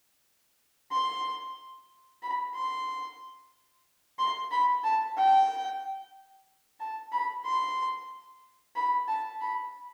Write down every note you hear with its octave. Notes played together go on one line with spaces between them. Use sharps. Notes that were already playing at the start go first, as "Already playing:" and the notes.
C6
B5
C6
C6
B5
A5
G5
A5
B5
C6
B5
A5
B5